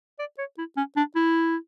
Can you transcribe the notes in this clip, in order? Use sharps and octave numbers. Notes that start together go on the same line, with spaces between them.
D5
C#5
E4
C#4
D4
E4